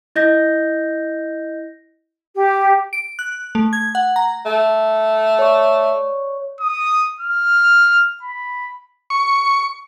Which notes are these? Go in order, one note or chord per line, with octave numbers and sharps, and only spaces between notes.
E4 D#5 G6 A#6
G4
D7
F#6
A3
G#6
F#5
A#5
A3
C#5 D5 C#6
D#6
F6
B5
C#6